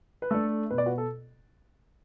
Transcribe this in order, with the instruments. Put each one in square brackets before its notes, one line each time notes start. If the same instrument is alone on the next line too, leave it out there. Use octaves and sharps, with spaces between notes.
[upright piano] B4
A3 D4 A4
B2 B4
D5
F#4 B4
A4